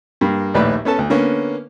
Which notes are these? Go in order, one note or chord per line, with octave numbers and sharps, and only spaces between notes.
G2 A#3
A#1 D#2 A2 B4 D5 B5
B3 C#4 A4 A5
D2
D3 A#3 B3 C#4